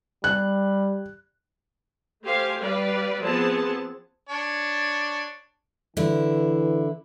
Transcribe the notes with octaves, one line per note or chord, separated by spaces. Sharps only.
G3 F#6
A3 G4 C5 F5 G#5
G3 B4 D5 F5
F3 B3 C4 G#4 A5
D4 C#5
D3 E3 E4